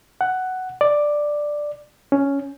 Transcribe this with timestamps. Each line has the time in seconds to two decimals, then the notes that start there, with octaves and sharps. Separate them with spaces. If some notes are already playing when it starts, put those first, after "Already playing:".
0.21 F#5
0.81 D5
2.12 C#4